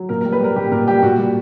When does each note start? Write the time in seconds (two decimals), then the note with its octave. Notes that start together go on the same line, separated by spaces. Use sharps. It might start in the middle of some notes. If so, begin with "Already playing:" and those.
Already playing: F#3
0.09 A#2 A#4
0.21 A#4
0.25 G3
0.32 B4
0.40 G3 A#4
0.56 A#2 G4
0.72 A#2 A#4
0.87 G3 G4
1.02 A#2 F#4
1.19 G3